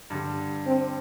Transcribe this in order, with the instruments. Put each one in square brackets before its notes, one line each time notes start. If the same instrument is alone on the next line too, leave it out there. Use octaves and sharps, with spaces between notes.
[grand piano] G2 D3 G3
[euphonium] C4